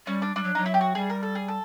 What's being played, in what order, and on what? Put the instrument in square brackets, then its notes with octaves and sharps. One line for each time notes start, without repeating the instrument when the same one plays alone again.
[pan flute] G3 [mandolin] C#4
[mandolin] D4
[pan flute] G3 [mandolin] D4
[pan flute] F#3
[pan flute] F#3 [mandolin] D#4
[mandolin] E4
G4
F#4
[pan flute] G3 [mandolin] G#4
[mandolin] A#4
A4
G#4
A4